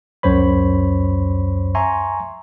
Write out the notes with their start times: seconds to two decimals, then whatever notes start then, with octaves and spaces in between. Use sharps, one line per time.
0.23 C#2 F#2 C5 C#5 B5
1.75 E5 G#5 A#5 C6 C#6